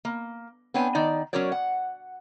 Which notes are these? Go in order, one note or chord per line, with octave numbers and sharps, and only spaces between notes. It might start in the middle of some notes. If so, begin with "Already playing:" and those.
A#3
B3 C4 D4 C#5 G5 G#5
D#3 D#4 D5
F#3 C#4 F#4 A#4 C#5 D5
F#5